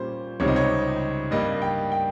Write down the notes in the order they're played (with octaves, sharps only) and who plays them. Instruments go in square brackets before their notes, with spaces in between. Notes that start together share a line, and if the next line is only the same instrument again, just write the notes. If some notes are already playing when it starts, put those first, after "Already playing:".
Already playing: [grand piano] A#2 G3 C#4 C5
C#2 C3 G3 C4 D#4 C#5
D#5
C#5
G2 G3 A#3 D#5
G5
G5